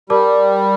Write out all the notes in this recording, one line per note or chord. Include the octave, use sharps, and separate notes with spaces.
G3 A#4 D5 A5 D6